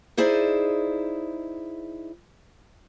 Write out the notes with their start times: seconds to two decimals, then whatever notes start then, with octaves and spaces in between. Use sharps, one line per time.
0.17 D#4 E4 G#4 C5 D5